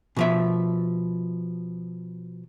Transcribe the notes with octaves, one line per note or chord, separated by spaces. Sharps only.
B2 F3 E5